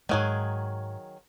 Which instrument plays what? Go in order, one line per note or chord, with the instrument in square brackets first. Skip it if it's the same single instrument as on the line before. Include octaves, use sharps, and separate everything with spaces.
[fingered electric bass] G#2 G#3 [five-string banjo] D#3 F#3 G#4